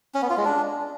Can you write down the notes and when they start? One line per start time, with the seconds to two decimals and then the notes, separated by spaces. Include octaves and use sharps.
0.14 C#4
0.22 B3
0.30 F4
0.37 G#3
0.45 D4